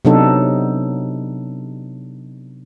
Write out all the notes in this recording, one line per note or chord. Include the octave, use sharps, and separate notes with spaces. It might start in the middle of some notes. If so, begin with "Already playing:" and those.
C3 F#3 B3 D4 D#4 A4